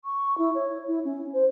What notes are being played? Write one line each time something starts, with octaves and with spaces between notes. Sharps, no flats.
C#6
E4
C#5
E4
C#4
C5